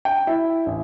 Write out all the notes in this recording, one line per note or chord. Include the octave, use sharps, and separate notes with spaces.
G5
E4
A1